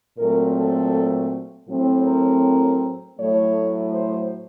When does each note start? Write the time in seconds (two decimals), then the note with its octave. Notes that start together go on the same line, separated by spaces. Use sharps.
0.18 A#2 F#3 A3 C4 A#4
0.55 A4
1.69 A2 F#3 C4
2.05 A#4
3.18 A2 F#3 A3 C#5
3.93 C5